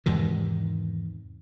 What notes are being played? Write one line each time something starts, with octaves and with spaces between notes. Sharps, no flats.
E2 G#2 C3 D#3